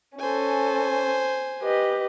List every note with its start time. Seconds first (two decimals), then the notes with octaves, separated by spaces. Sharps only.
0.19 C#4 A4 C5 G#5
1.63 G4 B4 D#5